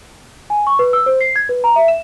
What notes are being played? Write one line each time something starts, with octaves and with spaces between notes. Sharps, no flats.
G#5
C#6
B4
E6
C5
C7
G#6
B4
A#5
E5
E7